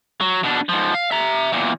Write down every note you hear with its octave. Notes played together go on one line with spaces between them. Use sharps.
F#3
B2 D4
G#2 F3
F5
E5 A#5
E2 A#2